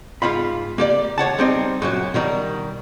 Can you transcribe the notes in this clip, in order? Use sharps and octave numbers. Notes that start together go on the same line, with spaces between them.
G#2 F4 F5 B5
A#3 G4 D5
D#2 C#5 F#5 A5
G3 C4 D#4
F#2 A#2 F#3
B2 D#3 G3 A#4